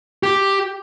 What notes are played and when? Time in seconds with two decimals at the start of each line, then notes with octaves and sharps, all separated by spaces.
0.23 G4